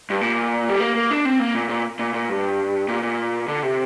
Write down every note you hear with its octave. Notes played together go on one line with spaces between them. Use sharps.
G2
A#2
G3
A#3
A#3
D4
C4
A#3
A#2
A#2
A#2
A#2
G2
A#2
A#2
D3
C3